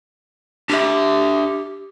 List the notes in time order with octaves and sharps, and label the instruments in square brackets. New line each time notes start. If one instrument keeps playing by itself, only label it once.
[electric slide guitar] D4 E5 [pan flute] G4